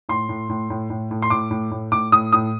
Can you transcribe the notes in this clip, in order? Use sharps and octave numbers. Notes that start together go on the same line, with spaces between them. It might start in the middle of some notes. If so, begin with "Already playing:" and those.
A2 C6
A2
A2
A2
A2
A2
C6
A2 D6
A2
A2
A2 D6
A2 D#6
A2 D#6